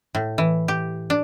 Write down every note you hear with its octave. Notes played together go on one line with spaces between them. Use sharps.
A2
E3
G4
D4